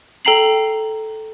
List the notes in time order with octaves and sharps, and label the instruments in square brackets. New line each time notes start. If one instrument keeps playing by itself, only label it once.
[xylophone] A4 G5 A#5 C7 F#7